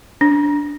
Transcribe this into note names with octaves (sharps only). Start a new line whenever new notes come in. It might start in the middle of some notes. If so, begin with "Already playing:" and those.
D4